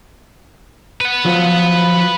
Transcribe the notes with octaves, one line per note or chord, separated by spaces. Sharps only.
B4 F#5
F3 F#3 F4